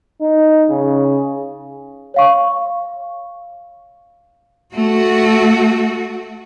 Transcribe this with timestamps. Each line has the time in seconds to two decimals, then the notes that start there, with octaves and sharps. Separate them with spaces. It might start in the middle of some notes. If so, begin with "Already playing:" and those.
0.21 D#4
0.70 C#3
2.14 C#5 F5 C#6
4.74 A3 F#4